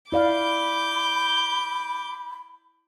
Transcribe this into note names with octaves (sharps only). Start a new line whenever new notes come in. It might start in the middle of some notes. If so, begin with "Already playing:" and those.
E4 D5 F5 B5 D6 G6